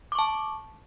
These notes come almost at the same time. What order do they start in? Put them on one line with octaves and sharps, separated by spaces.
D6 C#6 A5